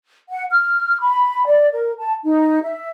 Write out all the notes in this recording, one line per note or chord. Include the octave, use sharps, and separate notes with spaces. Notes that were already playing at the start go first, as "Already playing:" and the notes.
F#5
F6
B5
D5
A#4
A5
D#4
E5